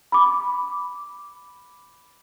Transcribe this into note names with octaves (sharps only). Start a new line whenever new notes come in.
B5 D6